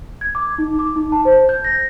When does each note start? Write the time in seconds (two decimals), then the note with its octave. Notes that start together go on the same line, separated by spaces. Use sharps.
0.21 G#6
0.35 D6
0.58 D#4
0.79 D6
0.96 D#4
1.12 A5
1.25 C5
1.49 G6
1.64 A#6